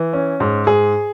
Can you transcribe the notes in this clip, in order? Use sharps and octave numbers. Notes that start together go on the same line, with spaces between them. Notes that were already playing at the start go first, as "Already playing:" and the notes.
Already playing: E3
C#4
G#2
G#2 G#4